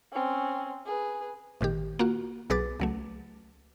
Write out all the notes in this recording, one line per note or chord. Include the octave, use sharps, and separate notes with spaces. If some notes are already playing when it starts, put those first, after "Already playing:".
C4 C#4
G#4 B4
G#1 A#2 D#3 G4
A#3 F4 F#4
B1 F#3 G#4 B4 D6 A6
C#2 F#3 A3